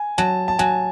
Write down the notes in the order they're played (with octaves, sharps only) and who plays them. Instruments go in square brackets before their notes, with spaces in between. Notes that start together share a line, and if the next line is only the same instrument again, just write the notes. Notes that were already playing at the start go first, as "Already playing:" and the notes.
Already playing: [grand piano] G#5
[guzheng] F#3 [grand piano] A5
[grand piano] A5
[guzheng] F#3 [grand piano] G#5